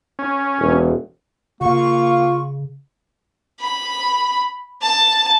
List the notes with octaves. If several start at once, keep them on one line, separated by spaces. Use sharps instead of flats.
C#4
E1
C#3 A#3 F4 C#6
B5
A5